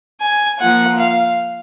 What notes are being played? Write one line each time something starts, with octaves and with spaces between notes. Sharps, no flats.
G#5
F3 A#3 F4 F#5
F5